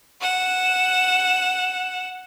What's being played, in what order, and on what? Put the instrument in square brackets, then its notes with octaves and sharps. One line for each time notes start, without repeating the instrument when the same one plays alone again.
[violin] F#5 E7